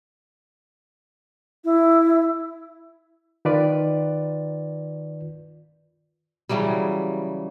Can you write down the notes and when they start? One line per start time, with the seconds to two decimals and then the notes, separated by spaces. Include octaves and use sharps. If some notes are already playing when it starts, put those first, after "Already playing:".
1.65 E4
3.45 D#3 F4 B4 D5
6.49 C#3 E3 F#3 G3